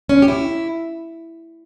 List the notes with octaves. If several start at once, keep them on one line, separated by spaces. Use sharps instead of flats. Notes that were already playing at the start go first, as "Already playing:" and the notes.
C#4
G4
E4